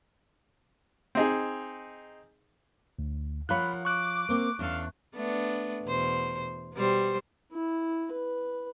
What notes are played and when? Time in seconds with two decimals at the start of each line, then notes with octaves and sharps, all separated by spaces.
1.15 C4 D#4 G#4
2.99 D2
3.49 F3 F4 A#4 C#5 F5 F#5 B5 F#6
3.85 C#6 D6 F#6
4.29 A#3 C4
4.59 E2 C#4 D4 A4 F5
5.15 A3 B3 D4
5.84 E2 B2 C5
6.74 B2 G3 C5
7.52 E4
8.12 B4